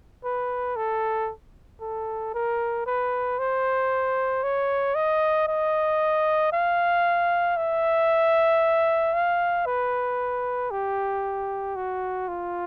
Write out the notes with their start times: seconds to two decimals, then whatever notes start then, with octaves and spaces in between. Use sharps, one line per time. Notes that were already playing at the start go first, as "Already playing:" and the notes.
0.25 B4
0.76 A4
1.81 A4
2.34 A#4
2.86 B4
3.39 C5
4.44 C#5
4.95 D#5
5.48 D#5
6.53 F5
7.57 E5
9.14 F5
9.66 B4
10.71 G4
11.76 F#4
12.28 F4